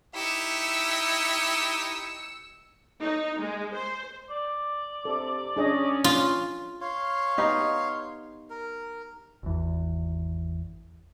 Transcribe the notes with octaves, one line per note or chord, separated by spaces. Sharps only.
D#4 E4 G4 E6 C#7
D#4
G#3
C5
D5
C3 A4
C#4 D4 G#4 D#5
F4
C#5 F5 C6
B3 D#4 G4
A#4
G#1 E2